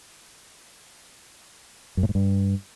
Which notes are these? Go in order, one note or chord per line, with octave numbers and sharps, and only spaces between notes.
F#2
A2
G#2
G2